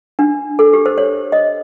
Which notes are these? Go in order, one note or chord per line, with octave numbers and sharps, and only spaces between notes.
D4
A4
G4
C5
C#5
D#5